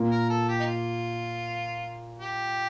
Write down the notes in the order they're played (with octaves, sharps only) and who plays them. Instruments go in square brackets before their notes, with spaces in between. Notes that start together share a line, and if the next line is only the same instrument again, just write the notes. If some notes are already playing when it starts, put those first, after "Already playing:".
Already playing: [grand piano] A#2 A#3
[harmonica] A#4
A4
G4
D#4
F4
G4